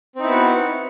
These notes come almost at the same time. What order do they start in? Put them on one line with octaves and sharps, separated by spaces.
C4 D#4 E4 B3 F#4